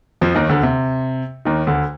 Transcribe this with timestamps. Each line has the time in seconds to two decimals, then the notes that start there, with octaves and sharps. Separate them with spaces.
0.21 F2 F3
0.35 D#2 D#3
0.49 D2 D3
0.63 C3
1.45 D#2 D#3
1.67 D2 D3